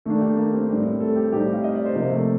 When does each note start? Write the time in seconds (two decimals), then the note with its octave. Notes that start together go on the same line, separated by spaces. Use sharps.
0.05 D#3 A3 A#3 D4 A4
0.21 G4
0.37 A#3 A#4
0.53 C4 C5
0.69 A2 G3 C4
1.00 A3 A4
1.16 G4
1.32 A2 G3 C4 D#4 G4
1.54 F5
1.64 D#5
1.75 D5
1.85 C5
1.95 C3 F3 A#3 C4 A#4
2.11 A3 A4